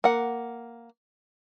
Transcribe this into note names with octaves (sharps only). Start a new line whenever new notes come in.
A#3 F#5